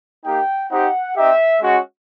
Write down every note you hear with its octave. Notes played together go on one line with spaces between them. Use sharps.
A#3 D#4 G4 G5
C4 D#4 G4 F#5
C4 D#4 G4 E5
G#3 C#4 F#4